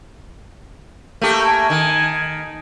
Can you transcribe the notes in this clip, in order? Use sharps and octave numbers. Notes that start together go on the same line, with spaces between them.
A3 A#3 G4
G#5
D#3